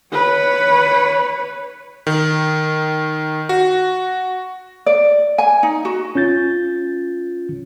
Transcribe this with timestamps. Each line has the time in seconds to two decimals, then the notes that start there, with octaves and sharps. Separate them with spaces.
0.13 B4 C#5
2.07 D#3
3.49 F#4
4.86 D5
5.38 G#5
5.63 D#4
5.85 F#4
6.15 C#4 F4 G6 A6